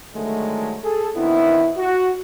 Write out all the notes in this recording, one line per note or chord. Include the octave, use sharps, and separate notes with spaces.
D3 D#3 F#3 G#3 A3
G#4 A4
B2 D#3 B3 C4 D4 E4
F#4